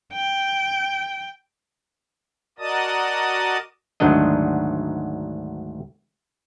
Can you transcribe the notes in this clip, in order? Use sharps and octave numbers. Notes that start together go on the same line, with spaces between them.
G5
F#4 A#4 D5 D#5 A5 D#6
D2 G#2 D#3 F#3 D4 D#5